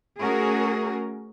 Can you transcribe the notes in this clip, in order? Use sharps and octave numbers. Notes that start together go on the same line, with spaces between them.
A3 C#4 F#4 G#4 A#4